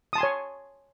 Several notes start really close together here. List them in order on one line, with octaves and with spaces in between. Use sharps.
D#6 A5 C6 G#5 C#5